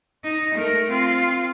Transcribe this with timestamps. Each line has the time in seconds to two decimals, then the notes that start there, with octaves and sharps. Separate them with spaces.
0.24 D#4
0.54 A3 A#4
0.89 C4 F4